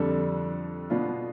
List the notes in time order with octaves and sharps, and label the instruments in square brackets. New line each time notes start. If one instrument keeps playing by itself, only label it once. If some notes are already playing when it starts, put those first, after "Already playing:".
Already playing: [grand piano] F2 D3 G3 D4 A4
B2 B3 D4 F4